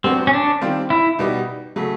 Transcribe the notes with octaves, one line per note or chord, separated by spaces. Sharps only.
F#3 B3 C4 D4 F#4
C#4
D4
D#3 G3 C4 F4
E4
B2 G3 B3 D#4 G4
C#3 F#3 A3